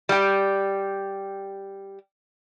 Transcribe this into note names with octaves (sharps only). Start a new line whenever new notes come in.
G3 G4